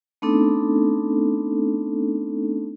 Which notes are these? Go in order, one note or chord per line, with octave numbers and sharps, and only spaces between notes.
A3 B3 C4 D4 D#4 A4